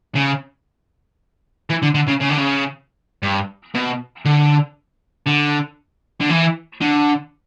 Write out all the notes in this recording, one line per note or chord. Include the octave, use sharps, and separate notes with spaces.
C#3
E3
D3
D3
C#3
C#3
D3
C#3
G2
B2
D3
D3
D3
E3
D3